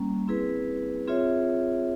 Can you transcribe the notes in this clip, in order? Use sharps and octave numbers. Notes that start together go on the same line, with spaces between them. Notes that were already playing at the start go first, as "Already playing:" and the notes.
Already playing: G3 A#3 C#4
C4 E4 G#4 B4
C4 F4 G#4 C#5 E5